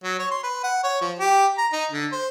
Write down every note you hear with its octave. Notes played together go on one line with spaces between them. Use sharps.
F#3
C#5
C6
B4
F#5
C#5
F3
G4
A#5
D#4
D3
C5